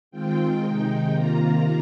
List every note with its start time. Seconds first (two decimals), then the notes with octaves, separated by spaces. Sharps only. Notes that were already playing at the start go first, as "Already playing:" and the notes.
0.11 D#3 G#3 C4 F4 G5
0.61 C3 D#3 G#3 D#4
1.11 C3 D#3 A#3 F4 A#5